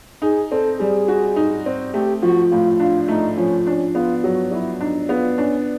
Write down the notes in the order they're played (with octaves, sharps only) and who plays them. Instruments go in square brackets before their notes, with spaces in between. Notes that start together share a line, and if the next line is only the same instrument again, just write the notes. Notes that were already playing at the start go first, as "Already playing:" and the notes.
[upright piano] D#4 [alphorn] G#4
[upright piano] C4 [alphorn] A4
[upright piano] G3 [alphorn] G#4
[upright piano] F#4
D#4
C4
[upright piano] A3 [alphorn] G4
[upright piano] F3 [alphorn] F#4
[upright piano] A2 [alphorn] F4
[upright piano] D4 [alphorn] F4
[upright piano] A3 [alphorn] D#4
[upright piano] F3 [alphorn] C#4
[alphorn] C#4 [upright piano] D4
[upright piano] B3 [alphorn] F4
[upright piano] F#3 [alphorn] F#4
[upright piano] F#3 [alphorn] E4
[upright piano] D4 [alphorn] D#4
[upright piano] B3 [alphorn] F4
[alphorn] C#4 [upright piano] D4